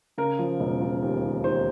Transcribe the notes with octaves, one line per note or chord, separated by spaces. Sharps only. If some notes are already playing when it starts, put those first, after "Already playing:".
C#3 A#4
F3
E1
F3
D#2
D#2
D#2 C5